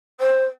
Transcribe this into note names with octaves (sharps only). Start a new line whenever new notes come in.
C5